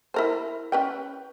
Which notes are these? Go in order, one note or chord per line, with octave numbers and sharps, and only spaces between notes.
E4 A#4 C5
C#4 B4 G5